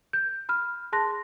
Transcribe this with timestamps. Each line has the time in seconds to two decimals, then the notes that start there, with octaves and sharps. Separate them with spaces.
0.13 G6
0.49 B5 F6
0.93 G#4 A5 C6 F#6 A#6